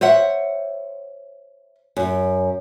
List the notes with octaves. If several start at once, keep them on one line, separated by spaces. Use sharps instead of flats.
C5 C#5 E5 F#5
F#2